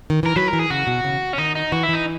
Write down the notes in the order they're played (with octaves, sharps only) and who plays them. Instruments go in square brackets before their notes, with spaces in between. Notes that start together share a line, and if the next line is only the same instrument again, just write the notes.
[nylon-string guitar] D#3
[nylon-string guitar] E3 [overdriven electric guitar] A#4
[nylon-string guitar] F#3 [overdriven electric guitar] B4
[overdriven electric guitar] A#4
[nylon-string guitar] E3
[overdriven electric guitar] G#4
[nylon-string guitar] C#3 [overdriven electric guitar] F#4
[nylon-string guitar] B2
C#3
[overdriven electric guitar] C#4
[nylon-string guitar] D#3 [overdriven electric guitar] D#4
[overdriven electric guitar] D#4
[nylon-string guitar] E3 [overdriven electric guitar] F#4
[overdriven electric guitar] E4
[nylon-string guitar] E3 [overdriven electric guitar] D#4